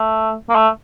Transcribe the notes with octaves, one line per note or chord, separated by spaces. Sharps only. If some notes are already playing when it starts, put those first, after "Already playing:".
Already playing: A3
A#3
A3